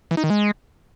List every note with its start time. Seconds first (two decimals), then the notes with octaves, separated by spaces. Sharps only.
0.11 E3
0.17 D#4
0.24 D#3
0.30 G#3